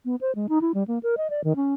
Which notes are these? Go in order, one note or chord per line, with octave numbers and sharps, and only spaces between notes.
B3
C5
G#3
D#4
E4
G3
A#3
A#4
D#5
D5
D#3
C#4